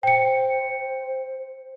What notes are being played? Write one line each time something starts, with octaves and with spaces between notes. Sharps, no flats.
C5 G5 C#7